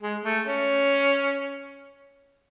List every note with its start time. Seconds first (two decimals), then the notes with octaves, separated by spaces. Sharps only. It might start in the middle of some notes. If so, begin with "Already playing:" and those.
0.02 G#3
0.24 A3
0.47 C#4